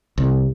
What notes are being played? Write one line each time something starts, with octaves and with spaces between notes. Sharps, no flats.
C2